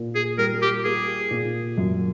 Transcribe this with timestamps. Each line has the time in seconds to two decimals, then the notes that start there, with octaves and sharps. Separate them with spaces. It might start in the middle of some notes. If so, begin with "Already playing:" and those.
Already playing: A#2
0.15 G#4
0.38 G3 A#4
0.62 G4
0.84 A#3 G#4
1.31 A#2
1.78 F#2